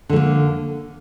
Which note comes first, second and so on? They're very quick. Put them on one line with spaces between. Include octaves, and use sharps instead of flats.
D3 A3 A#3